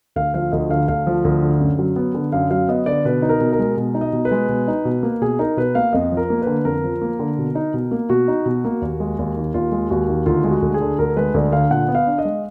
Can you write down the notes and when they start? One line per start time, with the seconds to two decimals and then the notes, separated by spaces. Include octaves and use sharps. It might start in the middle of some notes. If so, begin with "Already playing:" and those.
0.16 D2 F5
0.34 F3 F5
0.52 D2 D#5
0.70 D3 F5
0.88 D2 F5
1.07 F3
1.25 D2
1.42 D3
1.60 F#2
1.79 F#3
1.96 B3
2.14 D3
2.32 F#2 F5
2.51 F#3 F5
2.69 B3 D#5
2.86 D3 D5
3.05 B2 B4
3.22 D#4
3.29 A#4
3.41 B2
3.53 A#4
3.59 G#3
3.77 B2
3.94 D#4
4.01 D#5
4.13 B2
4.25 B4
4.31 G#3
4.49 B2
4.68 D#4
4.85 B2
5.03 A#3
5.21 B2 G#4
5.39 D#4 A#4
5.57 B2 B4
5.75 A#3 F5
5.93 F2 D#5
6.12 F3
6.17 A#4
6.30 A#3
6.42 B4
6.47 D3
6.65 F2 A#4
6.84 F3
7.02 A#3
7.19 D3
7.38 B2
7.55 D#4
7.74 B2
7.91 A#3
8.10 B2 F#4
8.28 D#4
8.46 B2
8.65 A#3
8.82 D#2
9.00 G#3
9.19 D#2
9.37 D#3
9.54 D#2 F4
9.72 G#3
9.90 D#2 F#4
10.09 D#3
10.26 D2 F4
10.44 G#3
10.51 F#4
10.62 D2
10.74 G#4
10.81 D3
10.99 D2 A#4
11.17 G#3 B4
11.34 D2 D5
11.53 D3 F5
11.71 A#2 F#5
11.88 B3
11.95 F5
12.07 D4
12.18 D#5
12.25 G#3